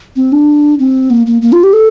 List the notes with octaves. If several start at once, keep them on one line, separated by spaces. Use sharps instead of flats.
C4
D4
C4
A#3
A#3
A#3
F4
G4
A4